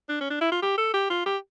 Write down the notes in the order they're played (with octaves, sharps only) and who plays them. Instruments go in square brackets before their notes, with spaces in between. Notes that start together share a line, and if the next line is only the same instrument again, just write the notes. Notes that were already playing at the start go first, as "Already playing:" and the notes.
[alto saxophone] D4
C#4
D4
E4
F4
G4
A4
G4
F4
G4